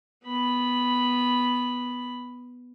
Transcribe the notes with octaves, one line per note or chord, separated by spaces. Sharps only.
B3 B5